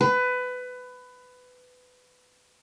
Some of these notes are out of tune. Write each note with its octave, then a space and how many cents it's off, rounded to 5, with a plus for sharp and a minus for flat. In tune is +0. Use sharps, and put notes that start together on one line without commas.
B4 +20